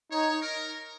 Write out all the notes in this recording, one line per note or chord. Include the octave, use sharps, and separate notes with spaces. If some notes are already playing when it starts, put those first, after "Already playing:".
D#4 C#5
A#4